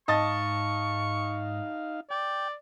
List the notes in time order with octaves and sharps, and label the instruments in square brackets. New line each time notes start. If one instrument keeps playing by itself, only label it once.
[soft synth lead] G#2 [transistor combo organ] D#4 F5 [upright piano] D#5 A5 A6 [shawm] C#6
[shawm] D5 [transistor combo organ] G5